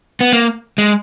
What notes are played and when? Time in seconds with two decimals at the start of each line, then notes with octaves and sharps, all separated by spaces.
0.21 B3
0.33 A#3
0.78 G#3